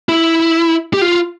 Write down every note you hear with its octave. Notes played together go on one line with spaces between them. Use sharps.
E4
G4
F4